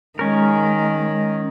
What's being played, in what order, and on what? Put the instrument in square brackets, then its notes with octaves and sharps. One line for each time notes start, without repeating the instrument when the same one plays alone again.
[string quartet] D#3 [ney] G#3 [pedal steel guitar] C#4 A#4